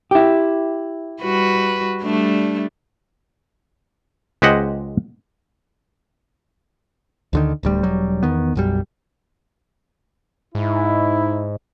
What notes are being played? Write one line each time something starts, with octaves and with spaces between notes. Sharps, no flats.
E4 G4
G3 F#4 B4
G3 A3 D4
C#2 G#3 G4 C5 D#5 F#5
D2 D3 D#3
D1 D2 G3
E1 F#3 G3
E2 D#3 B3
B1 F#2 G3
G#2 D#4 E4